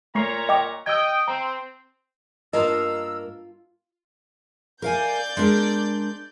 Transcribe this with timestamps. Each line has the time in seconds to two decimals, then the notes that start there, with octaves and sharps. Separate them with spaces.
0.15 A#2 A3 C#5 A#5 C#6 C7
0.49 D#5 G5 D6
0.86 D#5 G5 E6 G#6
1.28 C4 A#5
2.53 G2 A#3 F4 A#4 D#5 F5 A5 E6
4.82 A#4 D5 F5 G#5 G6
5.37 G#3 D4 A#4